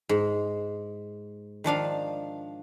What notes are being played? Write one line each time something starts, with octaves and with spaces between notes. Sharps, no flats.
G#2
D#3 F3 D4 F5